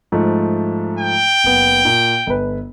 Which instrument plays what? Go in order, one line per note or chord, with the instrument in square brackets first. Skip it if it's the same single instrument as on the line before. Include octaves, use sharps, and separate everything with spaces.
[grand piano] G#2 F3 A3
[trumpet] G5
[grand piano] F#1 B3
A#2
G1 B4